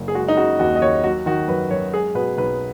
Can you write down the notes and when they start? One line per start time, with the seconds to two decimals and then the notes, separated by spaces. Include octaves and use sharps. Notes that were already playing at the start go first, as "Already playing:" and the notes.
Already playing: F#1
0.08 G#4
0.15 G#3 F#4
0.28 D#4
0.37 C#3 F#4
0.59 D#2 F#4
0.76 D#5
0.82 D#2 C#5
1.04 F#3 F#4
1.26 D#3 F#4
1.48 F#2 B4
1.70 F#2 C#5
1.94 G#3 G#4
2.15 B2 B4
2.37 B1 B4